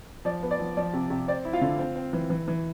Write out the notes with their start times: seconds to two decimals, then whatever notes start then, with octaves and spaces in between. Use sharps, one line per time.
0.25 F3 D5
0.43 B3
0.51 D5
0.60 F3
0.77 F3 D5
0.93 C3
1.10 C3
1.28 C4 D5
1.45 E4
1.53 F4 F5
1.61 D3
1.79 C4
1.96 C4
2.13 E3
2.30 E3
2.48 E3